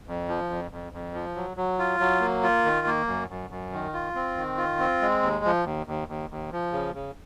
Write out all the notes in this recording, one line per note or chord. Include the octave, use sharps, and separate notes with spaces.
F2
F3
F2
F2
F2
F3
F#3
F#3
F4
F#3
A#3
F4
D#3
A#3
F#2
F#2
F#2
D#3
F4
C4
D#3
F4
C4
G#3
D#2
F3
D#2
D#2
D#2
D#2
F3
C#3
C#3